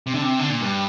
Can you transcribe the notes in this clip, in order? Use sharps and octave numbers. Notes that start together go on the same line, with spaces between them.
C3
D3
C3
D3
A#2
G2